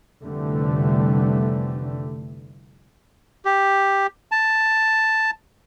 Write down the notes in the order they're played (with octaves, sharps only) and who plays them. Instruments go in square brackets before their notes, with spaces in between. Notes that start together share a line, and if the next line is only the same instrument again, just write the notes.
[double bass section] F1 D3 E3 G3 A3
[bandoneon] G4
A5